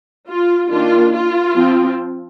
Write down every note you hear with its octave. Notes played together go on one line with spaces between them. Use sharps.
F4
D#3 A#3 D4 F4
F4
F3 C4